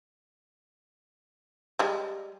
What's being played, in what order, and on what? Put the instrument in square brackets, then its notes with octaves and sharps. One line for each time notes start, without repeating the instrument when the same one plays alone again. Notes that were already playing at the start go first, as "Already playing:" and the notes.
[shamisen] G3 G#3